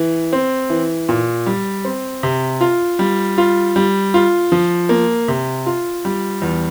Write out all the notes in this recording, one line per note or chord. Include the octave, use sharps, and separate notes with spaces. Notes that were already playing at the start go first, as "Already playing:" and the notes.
Already playing: E3
C4
E3
A#2
G3
C4
C3
F4
G3
F4
G3
F4
F3
A#3
C3
F4
G3
E2